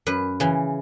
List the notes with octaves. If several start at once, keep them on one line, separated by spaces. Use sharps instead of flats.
F#2 B4
C#3 E3